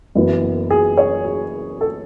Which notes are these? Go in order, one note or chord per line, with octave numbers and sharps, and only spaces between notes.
F#1 F#2 E3 B3
G#4
C#5
G#4
A4